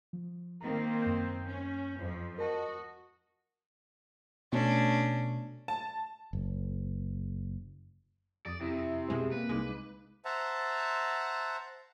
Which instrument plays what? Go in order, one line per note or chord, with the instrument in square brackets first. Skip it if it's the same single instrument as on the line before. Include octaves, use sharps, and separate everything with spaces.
[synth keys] F3
[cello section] D#3 A#3 C4 [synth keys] A#5
[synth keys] F#2 G6
[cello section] C#4
F2 F3
[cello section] F#4 D#5 [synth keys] A#4 A5
[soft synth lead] B2 [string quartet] A3 C#4 D4
[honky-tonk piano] A5
[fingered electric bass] F#1
[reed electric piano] F2 D#6 [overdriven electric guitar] D5
[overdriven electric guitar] C3 [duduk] E4
[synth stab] B2 G#3 C4
[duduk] A#3 [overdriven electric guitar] B4
[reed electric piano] C2 D#4 D6 [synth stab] G#3
[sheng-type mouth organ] C5 E5 F#5 A5 A#5